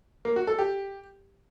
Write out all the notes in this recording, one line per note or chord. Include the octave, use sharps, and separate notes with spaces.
A#3
F#4
A4
G4